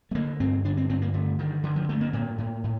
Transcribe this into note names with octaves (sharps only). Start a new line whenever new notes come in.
A3
D3 A#3
G2 C4
D3 D4
C4
G2 C4
A#3
D3 A3
G2 D#3
D3 D#3
F3
G2 A3
A#3
A2 A#3
A2
A2